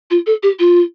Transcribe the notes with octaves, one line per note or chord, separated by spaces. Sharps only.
F4
A4
G4
F4